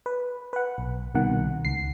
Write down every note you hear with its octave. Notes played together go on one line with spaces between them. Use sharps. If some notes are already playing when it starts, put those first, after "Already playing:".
B4
B4 F#5
B1
C2 B2 D#3 F#5
C#2 C7